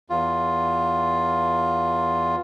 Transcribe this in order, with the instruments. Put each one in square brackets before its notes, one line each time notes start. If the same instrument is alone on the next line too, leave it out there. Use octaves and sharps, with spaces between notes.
[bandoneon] E2 F4